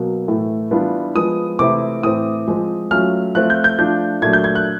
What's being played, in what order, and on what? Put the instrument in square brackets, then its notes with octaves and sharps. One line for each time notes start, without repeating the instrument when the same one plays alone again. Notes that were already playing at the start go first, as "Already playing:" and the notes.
Already playing: [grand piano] B2 F#3 A#3
A2 E3 A3
E3 G3 B3 D4 F4
F3 G#3 B3 D#6
C3 E3 A3 C4 E4 D6
A2 E3 A3 C4 D#6
F3 G#3 C4
F#3 A3 C#4 F4 F6
F3 A3 C4 F4 F#6
G6
G6
F3 A3 D4 F4 G6
A#2 F#3 A3 D4 G#6
G6
G#6
F#6